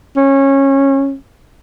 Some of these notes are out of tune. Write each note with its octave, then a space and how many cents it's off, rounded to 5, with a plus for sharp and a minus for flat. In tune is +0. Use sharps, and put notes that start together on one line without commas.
C#4 -20